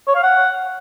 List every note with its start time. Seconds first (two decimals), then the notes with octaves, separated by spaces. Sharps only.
0.07 C#5
0.15 F5
0.23 F#5